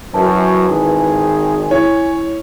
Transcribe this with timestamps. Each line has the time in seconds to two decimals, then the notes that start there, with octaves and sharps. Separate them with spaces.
0.14 F#2 E3 A5
0.69 G#1 D#3 G#4
1.71 C#4 E4 C#5